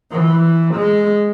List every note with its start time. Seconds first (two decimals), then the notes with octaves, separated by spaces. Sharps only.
0.11 E3
0.74 G#3